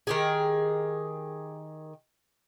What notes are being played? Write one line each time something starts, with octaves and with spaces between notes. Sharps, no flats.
D#3 G4 G#4